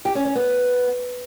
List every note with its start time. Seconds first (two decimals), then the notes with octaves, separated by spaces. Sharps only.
0.05 G4
0.15 C#4
0.25 C#4
0.35 B3